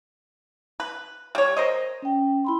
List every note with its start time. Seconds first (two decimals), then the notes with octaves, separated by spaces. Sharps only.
0.80 B4
1.35 G3 C#5
1.57 A#4 C5 D#5
2.02 C#4 G5
2.45 E4 B5 C6